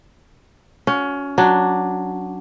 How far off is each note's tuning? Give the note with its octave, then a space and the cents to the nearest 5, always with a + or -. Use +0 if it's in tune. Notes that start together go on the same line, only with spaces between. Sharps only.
C#4 +20 F#4 -20
F#3 +0 D4 +0